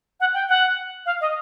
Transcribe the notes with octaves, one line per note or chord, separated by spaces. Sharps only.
F#5
G5
F#5
F5
D#5